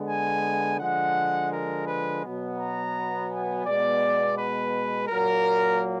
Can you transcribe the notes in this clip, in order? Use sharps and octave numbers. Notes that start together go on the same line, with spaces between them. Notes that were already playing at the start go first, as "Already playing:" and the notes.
Already playing: D3 G#3 B3
G#5
D3 F3 G#3 F#5
A#4
B4
B2 F#3 B3
A#5
G#5
B2 G#3 B3 D5
B4
A#2 F#3 A#3 A#4